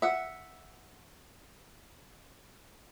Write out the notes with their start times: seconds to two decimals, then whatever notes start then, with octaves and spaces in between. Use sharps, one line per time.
0.02 E5 F#5